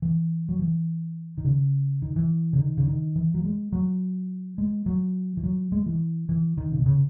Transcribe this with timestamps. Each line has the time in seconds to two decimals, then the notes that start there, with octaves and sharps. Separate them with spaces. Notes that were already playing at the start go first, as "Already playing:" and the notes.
0.02 E3
0.49 F#3
0.59 E3
1.38 D#3
1.45 C#3
2.02 D#3
2.16 E3
2.53 C#3
2.59 D#3
2.77 C#3
2.87 D#3
3.16 E3
3.34 F#3
3.44 G#3
3.72 F#3
4.58 G#3
4.86 F#3
5.37 E3
5.43 F#3
5.72 G#3
5.86 E3
6.29 E3
6.58 D#3
6.72 C#3
6.79 B2
6.86 C#3